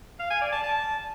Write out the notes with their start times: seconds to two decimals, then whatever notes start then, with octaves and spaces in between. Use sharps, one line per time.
0.19 F5
0.30 G#5
0.41 D5
0.52 A5
0.63 A5